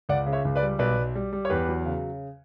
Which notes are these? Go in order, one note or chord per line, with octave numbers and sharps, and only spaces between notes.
C#2 D5 F#5
C#3
C#5 E5
C#2
B4 D5
G3
B1 B4 D5
B1
G3
G3
C#5
E2 G4 B4
F#3
C#3